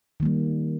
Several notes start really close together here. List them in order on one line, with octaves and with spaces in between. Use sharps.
D#3 A#3 G3